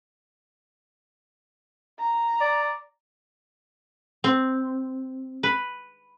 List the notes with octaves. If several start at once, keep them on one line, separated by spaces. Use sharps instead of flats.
A#5
D5
C4
B4